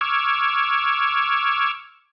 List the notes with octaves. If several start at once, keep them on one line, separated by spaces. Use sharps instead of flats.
C#6 D6 E6 F6 G#6